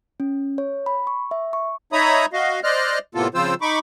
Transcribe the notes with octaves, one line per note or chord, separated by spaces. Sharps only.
C#4
C#5
B5
C#6
E5
C#6
D#4 C#5 E5 A#5 B5 D#6
F#4 D#5 F5
C5 D5 D#5 F6 F#6
A2 C3 A#3 B3 F4 A4
C#3 F3 C4 F4 C5 E6
D#4 B5 C#6 D6